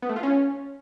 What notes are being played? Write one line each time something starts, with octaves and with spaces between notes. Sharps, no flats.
B3
A3
F4
C#4